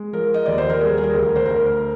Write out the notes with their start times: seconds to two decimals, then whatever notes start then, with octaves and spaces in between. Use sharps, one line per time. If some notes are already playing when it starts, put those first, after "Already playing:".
Already playing: G#3
0.13 F3 A#4
0.34 D#5
0.46 D#2 D5
0.58 C5
0.70 A#4
0.81 G3 G#4
0.98 G#4
1.03 A#4
1.14 D2
1.26 A#4
1.36 C5
1.45 D2 A#4